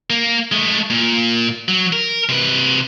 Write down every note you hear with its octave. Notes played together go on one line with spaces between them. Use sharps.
A#3
G#3 A3
A#2
F#3
A#4
C3 B4